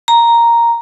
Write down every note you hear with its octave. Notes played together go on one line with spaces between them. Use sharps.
A#5